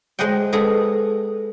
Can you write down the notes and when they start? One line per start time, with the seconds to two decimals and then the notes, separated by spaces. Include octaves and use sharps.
0.19 G#3 C5 D#5 F#5 G5
0.53 G#3 B3 G#4 A4